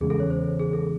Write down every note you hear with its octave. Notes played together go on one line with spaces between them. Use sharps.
E2 C#3 G#3 G#4
A4
C#5
C5
G#4
A4